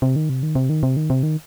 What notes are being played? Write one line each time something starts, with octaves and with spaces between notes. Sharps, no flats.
C3
D#3
C3
D#3
C3
D#3
C3
D#3
C3
D#3